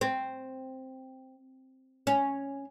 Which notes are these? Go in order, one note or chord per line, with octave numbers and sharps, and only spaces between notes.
C4
C#4